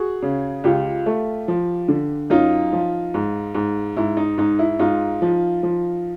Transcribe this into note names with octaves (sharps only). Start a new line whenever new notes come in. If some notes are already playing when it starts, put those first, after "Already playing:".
Already playing: F#4 G#4
C#3
C#2 F4 G4
A3
F3
D3
F#2 D#4 F4
F3
G#2
G#2
G#2 E4
D#4
G#2 D#4
E4
G#2 D#4 F4
F3
F3